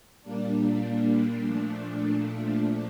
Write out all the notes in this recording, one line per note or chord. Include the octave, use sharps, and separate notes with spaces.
A#2 G3 A#3 D4
A#2 F3 A3 D4